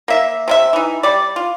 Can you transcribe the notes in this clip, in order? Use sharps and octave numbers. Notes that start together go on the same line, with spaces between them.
A#3 E5
C3 E4 E5
E3 D#4
G3 D5
F4